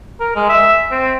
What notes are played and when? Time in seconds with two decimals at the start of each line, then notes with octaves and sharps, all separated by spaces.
0.20 A#4
0.36 G#3
0.49 E5
0.91 C4